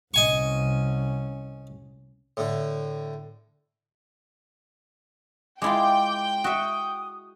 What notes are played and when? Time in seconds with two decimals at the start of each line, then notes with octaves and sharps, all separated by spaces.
0.14 C2 C#4 D#5 G#5 C#6
2.37 A2 D3
5.62 G#3 E4 F4 G5 D6
6.44 F#4 E5 D#6